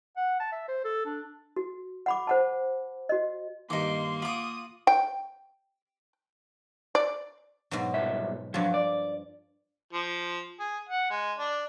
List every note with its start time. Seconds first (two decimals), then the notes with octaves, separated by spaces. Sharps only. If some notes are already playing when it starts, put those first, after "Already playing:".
0.17 F#5
0.40 A5
0.52 E5
0.68 C5
0.84 A4
1.06 D4
1.56 F#4
2.06 F#5 B5 D6
2.27 C5 F#5 A5
3.09 F#4 D#5
3.70 G2 D#3 A#3 D#4 C6 D6
4.22 F4 F#5 B5 D6 D#6
4.87 G5
6.95 D5
7.71 G#2 B2 F#3
7.94 C2 F#2 E5
8.54 G2 F3 F#3
8.74 D5
9.93 F3
10.60 G#4
10.89 F#5
11.10 G#3
11.38 D4